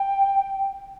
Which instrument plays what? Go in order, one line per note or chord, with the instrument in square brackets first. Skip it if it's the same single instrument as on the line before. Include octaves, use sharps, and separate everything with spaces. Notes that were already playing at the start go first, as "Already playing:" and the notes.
Already playing: [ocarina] G5